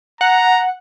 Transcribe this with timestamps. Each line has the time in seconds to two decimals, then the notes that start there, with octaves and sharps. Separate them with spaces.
0.21 F#5 A#5